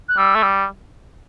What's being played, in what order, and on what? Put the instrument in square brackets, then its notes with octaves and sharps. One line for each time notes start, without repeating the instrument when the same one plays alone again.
[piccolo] F#6
[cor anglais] G3 [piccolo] E6
[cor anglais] A3
G3